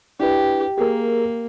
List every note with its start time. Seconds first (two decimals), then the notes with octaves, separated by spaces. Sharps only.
0.20 D4 E4 G4 B4
0.78 A#3 G4 G#4 A#4